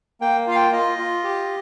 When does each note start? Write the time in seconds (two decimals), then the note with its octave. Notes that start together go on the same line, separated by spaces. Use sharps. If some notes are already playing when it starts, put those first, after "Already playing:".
0.21 A#3 G5
0.47 F4 F5
0.55 G5
0.72 F4 D#5
0.98 F4
1.24 G4